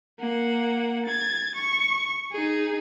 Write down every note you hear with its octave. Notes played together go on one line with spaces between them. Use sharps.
A#3 F#5
G#6 A6
C#6
D#4 G#4